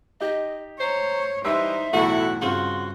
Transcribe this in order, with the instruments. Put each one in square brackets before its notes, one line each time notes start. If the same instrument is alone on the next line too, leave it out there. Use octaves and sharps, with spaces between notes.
[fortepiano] D#4 G4 [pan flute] D#5
[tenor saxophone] C5 [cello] C#5 [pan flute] A#5
[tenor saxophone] E3 [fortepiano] G3 C6 E6 [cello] D#4 C5 [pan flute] E5
[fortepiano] B1 E2 A2 [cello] E4 A4 [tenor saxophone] F#4
[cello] G2 [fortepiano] C#3 C4 F4 [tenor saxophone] F#4 [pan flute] C6